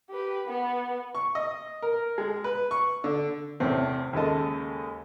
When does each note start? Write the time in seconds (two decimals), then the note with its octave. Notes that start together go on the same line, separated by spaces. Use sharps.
0.10 G4 B4
0.47 B3
1.15 C#6
1.35 D#5
1.82 A#4
2.18 G#3
2.44 B4
2.71 C#6
3.04 D3
3.60 E2 A2 C3 C4 C#4
4.13 D#2 C#3 G#3 A4 D#5 A5